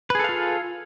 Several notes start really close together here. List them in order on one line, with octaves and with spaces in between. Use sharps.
B4 G#4 A4 F5 F4